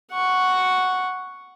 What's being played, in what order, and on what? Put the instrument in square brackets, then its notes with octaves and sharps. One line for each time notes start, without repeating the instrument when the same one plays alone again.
[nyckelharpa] F#5 C#6